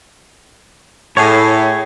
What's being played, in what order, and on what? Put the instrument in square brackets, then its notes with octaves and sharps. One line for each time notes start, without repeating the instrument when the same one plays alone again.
[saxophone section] A2 [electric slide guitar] G#4 C#5